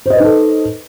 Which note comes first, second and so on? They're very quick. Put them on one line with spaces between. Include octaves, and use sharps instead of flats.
C5 D#5 B4 D#4 A4